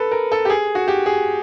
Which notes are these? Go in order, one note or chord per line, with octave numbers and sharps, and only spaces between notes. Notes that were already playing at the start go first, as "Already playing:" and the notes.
Already playing: A4 B4
A#4
A4
G4
G#4
F#4
G4
G#4